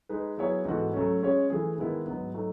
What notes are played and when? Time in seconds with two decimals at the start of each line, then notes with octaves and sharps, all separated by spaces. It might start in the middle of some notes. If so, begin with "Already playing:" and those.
0.09 G#3 D#4 G#4 B4
0.38 F#3 B3 E4 G#4 C#5
0.65 G#2 E3 B3 F#4 A4
0.93 F#3 A3 C#4
1.22 G#3 C#4 G#4 C#5
1.50 E3 A3 E4 G#4
1.78 D#3 G#3 B3 E4
2.06 G#2 F#3 B3
2.34 F#3 A3 D#4